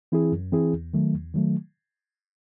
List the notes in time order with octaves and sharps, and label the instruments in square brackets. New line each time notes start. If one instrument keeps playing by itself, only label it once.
[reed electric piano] E3 C4 E4 G#4
F#2
E3 C4 E4 G#4
E2
D#3 F#3 A3
E2
D#3 F#3 A3